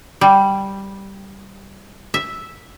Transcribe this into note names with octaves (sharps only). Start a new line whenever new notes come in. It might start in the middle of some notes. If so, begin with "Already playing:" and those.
G3
E5